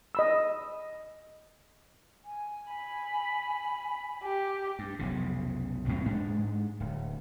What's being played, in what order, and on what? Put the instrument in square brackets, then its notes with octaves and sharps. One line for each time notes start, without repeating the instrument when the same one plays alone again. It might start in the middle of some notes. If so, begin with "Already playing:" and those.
[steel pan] D#5 B5 E6
[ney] G#5
[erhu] B5
G4
[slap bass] G2
F1 B1 C#3
E2 A2 G3 C4
G#2 G#3 D4
D1